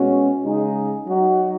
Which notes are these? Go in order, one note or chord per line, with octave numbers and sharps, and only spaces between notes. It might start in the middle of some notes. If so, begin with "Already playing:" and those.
Already playing: B2 G#3 C#4 F#4
C#3 G#3 D#4 G#4
F#3 D#4 F#4